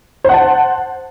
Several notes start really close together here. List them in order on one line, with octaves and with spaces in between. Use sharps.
C5 F#5 A5